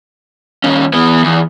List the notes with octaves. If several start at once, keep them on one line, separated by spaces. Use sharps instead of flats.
D#2 C#4
E3 B3
E2